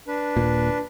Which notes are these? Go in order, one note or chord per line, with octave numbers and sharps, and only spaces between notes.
D4 B4
D#1 A#2